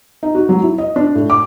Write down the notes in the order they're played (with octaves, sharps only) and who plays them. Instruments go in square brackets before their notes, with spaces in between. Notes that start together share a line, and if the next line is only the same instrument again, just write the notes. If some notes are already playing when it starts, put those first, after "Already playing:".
[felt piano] D#4
F#4
F#3
E4
D#5
D4
A2
D6